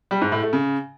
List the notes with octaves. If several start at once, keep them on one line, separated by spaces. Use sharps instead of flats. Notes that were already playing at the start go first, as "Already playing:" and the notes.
G3
G#2
A2
A3
C#3